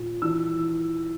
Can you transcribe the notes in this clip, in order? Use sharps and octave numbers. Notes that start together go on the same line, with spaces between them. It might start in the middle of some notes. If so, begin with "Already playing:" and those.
Already playing: A#2
E3 E6